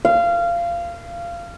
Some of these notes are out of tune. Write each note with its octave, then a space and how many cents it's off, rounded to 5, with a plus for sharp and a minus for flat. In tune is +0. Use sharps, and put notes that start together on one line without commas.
F5 -20